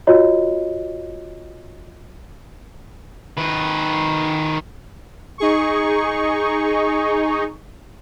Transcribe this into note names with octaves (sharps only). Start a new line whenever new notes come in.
F4 F#4 C#5 D#5
D#3 B4
D#4 G#4 C#6